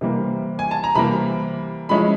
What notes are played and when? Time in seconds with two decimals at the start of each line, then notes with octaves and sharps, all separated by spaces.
0.01 C3 E3 G3 A#3
0.59 G#5
0.71 A5
0.84 A#5
0.95 C3 E3 G3 A#3 B5
1.89 F3 G#3 C#4 E4 B5